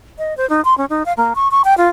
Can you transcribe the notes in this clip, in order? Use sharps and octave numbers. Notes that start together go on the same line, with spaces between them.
D#5
C5
D#4
C6
C#4
D#4
F5
A#3
C#6
C#6
G5
F4